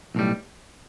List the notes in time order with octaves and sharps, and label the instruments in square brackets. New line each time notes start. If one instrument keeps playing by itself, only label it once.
[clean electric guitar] B1 A2 G3